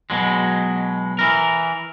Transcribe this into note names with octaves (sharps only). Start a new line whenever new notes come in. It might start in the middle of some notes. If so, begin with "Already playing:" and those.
B2 F#3 G#3
E3 A#4